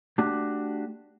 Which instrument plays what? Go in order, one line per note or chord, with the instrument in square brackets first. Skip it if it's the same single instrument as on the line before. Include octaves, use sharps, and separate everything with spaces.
[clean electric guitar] A3 D4 F#4 G4